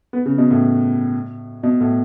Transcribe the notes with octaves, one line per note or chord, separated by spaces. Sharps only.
B3
C#3
B2
A2
B2
A2